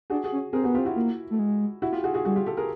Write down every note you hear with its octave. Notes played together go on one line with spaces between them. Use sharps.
D4 F#4 G#4
F#4 G#4
C#4
C4 G#4 A#4
B3 F#4 G#4
F4 G4
C4
E4 F#4
A#3
A3
G#3
E4 F#4
F4 G4
F#4 G#4
F#4 G#4
G3 F#4 G#4
F4 G4
G4 A4
G#4 A#4